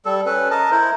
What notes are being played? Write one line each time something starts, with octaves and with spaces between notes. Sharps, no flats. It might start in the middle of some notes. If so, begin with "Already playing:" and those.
G3 A4
C#4 A4 B4
A#4 D#5 A5
E4 A#4 C5